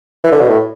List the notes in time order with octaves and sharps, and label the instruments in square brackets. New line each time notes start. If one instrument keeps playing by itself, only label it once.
[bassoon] E3
D3
B2
A2